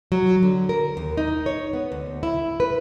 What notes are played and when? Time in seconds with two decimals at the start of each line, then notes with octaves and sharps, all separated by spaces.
0.12 F#3
0.42 D3
0.69 A#4
0.97 D#2
1.17 D#4
1.46 C#5
1.73 B3
1.92 D2
2.23 E4
2.60 B4